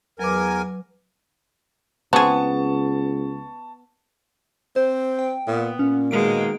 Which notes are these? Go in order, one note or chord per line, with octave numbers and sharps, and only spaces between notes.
E2 F#3 A#4 B4 G#5 D6
C#2 B3 C4 G#4 A5 C#6
C4 C5
G5
A#2 B3
A#2 C#4
B2 D#3 G#3 A#3 D7